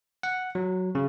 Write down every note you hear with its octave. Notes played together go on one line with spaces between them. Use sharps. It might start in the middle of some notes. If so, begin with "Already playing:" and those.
F#5
F#3
C#3